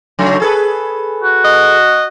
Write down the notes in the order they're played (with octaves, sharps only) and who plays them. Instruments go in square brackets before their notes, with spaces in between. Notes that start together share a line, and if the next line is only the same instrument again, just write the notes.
[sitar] C#3 F#3 A3
G#4 A4 B4
[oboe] F#4
[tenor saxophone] D#5